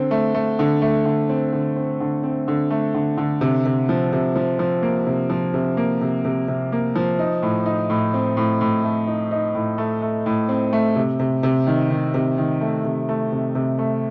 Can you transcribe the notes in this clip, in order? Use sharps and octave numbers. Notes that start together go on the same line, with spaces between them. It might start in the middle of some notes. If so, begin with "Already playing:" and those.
Already playing: D3 C4
A3
A3
D3
A3
D3
C4
D3
C4
D3
C4
D3
A3
D3
D3
C3
C3
F3
C3
F3
F3
A#3
C3
F3
C3
A#3
C3
C3
C3
A#3
F3
D#4
A2
D#4
A2
C4
A2
A2
A3
D#4
D#4
A2
A3
A3
A2
C4
A3
C3
C3
C3
D#3
D#3
C3
D#3
A3
C3
A3
C3
C3
A3